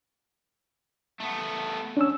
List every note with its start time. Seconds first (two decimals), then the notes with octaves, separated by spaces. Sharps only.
1.20 A3 B3
1.97 C#4 D4 E6